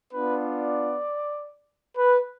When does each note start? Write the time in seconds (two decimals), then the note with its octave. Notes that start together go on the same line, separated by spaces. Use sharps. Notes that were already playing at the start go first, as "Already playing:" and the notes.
0.13 B3 D4 F4 B4
0.43 D5
1.97 B4